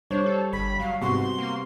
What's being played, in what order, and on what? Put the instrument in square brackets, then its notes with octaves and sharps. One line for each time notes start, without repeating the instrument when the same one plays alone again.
[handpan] G3 [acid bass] D4 [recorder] C5 [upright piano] C#5
[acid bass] A4
[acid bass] G1 [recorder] B5
[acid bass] F#3 [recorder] F5
[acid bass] G#2 [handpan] C3 B3 [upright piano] F#4 C#6 [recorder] C6
[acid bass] A#3